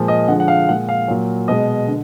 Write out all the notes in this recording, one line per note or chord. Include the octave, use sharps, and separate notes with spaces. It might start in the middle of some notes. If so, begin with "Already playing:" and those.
Already playing: A#2 F3 G#3
D#5
D3 F3 G#3 F#5
F#5
F5
A#2 G#3 F#5
F5
A#2 F#3
B2 G#3 D#5
D3